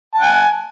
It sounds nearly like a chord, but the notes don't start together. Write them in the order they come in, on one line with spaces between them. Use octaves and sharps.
A5 F#5 G#5